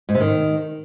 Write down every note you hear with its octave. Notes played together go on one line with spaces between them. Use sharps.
G#2
C3
D#3